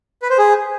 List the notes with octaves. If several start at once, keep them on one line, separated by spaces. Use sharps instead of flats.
B4
C5
G#4